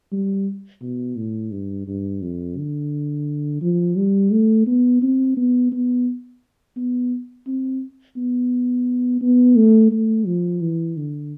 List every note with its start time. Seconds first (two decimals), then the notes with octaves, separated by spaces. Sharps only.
0.12 G3
0.82 B2
1.17 A2
1.51 G2
1.88 G2
2.22 F2
2.58 D3
3.62 F3
3.97 G3
4.32 A3
4.67 B3
5.02 C4
5.37 B3
5.72 B3
6.77 B3
7.47 C4
8.16 B3
9.22 B3
9.56 A3
9.91 A3
10.26 F3
10.62 E3
10.97 D3